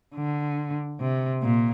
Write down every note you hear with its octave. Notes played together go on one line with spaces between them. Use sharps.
D3
C3
A#2